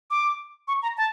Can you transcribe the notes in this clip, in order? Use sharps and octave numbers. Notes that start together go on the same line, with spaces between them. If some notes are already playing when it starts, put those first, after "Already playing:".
D6
C#6
A#5
A5